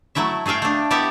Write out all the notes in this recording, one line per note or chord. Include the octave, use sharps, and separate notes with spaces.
F#3 A3 E4 E5
A3 G#4 E5 F5 G5
A3 D4
B3 E4 G4 A4 D5 E5